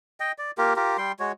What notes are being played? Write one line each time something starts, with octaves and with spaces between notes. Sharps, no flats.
D#5 G5
D5
A#3 F4 G4 A#4
F4 G4 A#4
G3 G5 C6
G#3 F#4 C#5